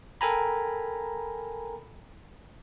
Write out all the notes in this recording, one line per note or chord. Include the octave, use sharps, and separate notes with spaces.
A4 A#4 G5 G#5 A#5 B5